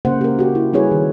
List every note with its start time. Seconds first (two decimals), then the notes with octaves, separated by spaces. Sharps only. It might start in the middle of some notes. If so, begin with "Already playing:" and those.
0.05 C#3 A#3 C5 F#5
0.21 G4 A#4
0.39 F#4 G4
0.55 E4
0.73 G3 E4 F#4 G#4 B4 C#5
0.91 D#3